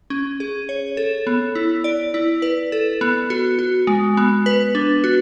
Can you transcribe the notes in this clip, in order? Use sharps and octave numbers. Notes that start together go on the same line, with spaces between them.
C#4
G#4
C#5
A4
B3
E4
D5
E4
B4
A4
B3
F#4
F#4
G#3
B3
B4
D4
F#4